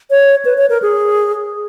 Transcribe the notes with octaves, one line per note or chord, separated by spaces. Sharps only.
C#5
B4
C#5
A#4
G#4